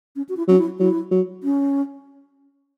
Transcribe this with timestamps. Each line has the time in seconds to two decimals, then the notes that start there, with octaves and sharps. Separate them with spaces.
0.16 C#4
0.29 F#4
0.37 E4
0.48 F#3 C#4
0.58 E4
0.80 F#3 E4
1.11 F#3
1.43 C#4